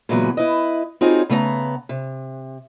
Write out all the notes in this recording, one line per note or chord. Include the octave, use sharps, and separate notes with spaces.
A#2 C#3 E3 F#3 G#3 B3
E4 B4 D#5
C4 D#4 F4 F#4 G#4 C#5
C#3 A3 B3 D5 A#5
C3